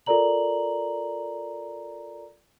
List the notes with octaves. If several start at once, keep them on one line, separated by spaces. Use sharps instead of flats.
F4 A4 A#4 D5 A#5 F#7